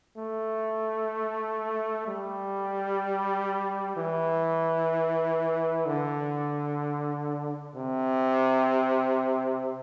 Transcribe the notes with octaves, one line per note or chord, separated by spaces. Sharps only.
A3
G3
E3
D3
C3